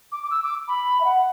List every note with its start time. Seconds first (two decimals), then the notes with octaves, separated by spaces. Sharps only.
0.12 D6
0.23 D6
0.30 E6
0.43 D6
0.68 B5
1.00 E5
1.04 F#5